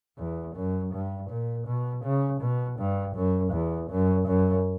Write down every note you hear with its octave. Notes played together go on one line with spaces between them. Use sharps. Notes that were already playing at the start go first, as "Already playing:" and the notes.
E2
F#2
G2
A#2
B2
C#3
B2
G2
F#2
E2
F#2
F#2